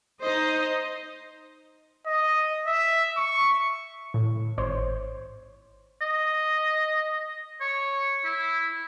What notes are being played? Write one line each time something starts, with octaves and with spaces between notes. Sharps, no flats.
D#4 C5 D#5
D#5
E5
C#6
A2
G#1 C5 C#5
D#5
C#5
E4